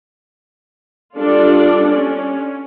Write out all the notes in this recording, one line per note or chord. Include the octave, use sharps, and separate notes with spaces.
G3 D4 F4 A4 D5
C#4